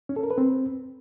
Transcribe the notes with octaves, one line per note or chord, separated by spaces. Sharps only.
C#4
A4
A#4
B4
C4